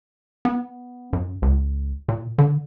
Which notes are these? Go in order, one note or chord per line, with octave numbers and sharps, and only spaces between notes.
B3
F#2
C#2
A#2
D3